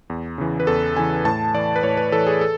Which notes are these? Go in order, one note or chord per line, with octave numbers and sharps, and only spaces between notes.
E2
C#3 E3
B4
E2 A4
C#3 E3 G#5
A2 A5
E3 D5
B4
A2 C#5
B4
E3 A4
G#4
A4